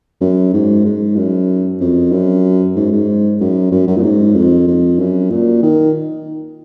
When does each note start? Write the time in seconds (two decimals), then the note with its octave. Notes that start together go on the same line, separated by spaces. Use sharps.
0.21 F#2
0.53 G#2
0.85 G#2
1.16 F#2
1.80 F2
2.12 F#2
2.76 G#2
2.92 G#2
3.40 F#2
3.72 F#2
3.87 F#2
3.97 A#2
4.03 G#2
4.35 F2
4.67 F2
4.99 F#2
5.30 A#2
5.62 D#3